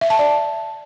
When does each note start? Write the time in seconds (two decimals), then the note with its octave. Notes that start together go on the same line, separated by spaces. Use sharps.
0.01 E5
0.10 A5
0.19 D5